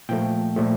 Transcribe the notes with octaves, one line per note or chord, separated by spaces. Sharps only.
A#2 F3 A3 G5
A#2 F3 A3